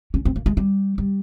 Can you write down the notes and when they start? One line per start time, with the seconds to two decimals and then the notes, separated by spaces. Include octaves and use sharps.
0.14 C#4
0.25 C4
0.36 A#3
0.46 G#3
0.57 G3
0.98 G3